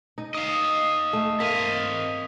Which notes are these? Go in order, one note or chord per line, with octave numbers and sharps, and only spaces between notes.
D#4
D#5 F5 D#6
A3
A#3 C4 D#5 B6 F7